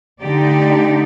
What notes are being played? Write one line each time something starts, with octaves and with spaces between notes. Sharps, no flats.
D3 A3 D#4 G4 D5